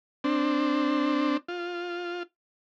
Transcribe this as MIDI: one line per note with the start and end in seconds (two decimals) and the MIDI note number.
0.24 1.37 60
0.24 1.37 62
1.48 2.23 65